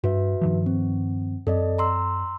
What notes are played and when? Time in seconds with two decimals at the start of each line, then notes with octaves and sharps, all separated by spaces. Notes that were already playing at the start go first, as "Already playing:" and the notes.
0.04 G2 F#4 B4 E5
0.41 G2 D#3 F3
0.66 C4
1.47 F#2 C4 A4 D5 D#5
1.78 A#5 C6 E6